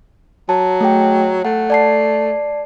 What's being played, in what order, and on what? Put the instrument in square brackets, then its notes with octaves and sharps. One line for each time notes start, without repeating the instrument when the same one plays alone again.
[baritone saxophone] F#3 [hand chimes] A5
[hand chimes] A3 G#4 G5
[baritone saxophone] A3 [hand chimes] F#5
[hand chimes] D5 A5 C7